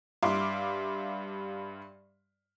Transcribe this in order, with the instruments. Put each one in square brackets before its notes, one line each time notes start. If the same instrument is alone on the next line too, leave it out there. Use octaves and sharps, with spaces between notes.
[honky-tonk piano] G2 E5 F5 C6 D6